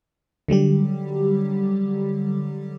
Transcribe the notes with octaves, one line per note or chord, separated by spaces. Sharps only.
D3 F#3 G3 G4